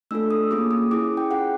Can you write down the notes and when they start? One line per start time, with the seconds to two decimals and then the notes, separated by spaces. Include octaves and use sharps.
0.11 A3 D4 F4 A4 E6
0.31 D#6
0.51 A#3 C#4 F4 G#4 D6
0.71 D#6
0.91 C#4 E4 G#4 D6
1.17 G5
1.31 C#4 F4 G#4 F#5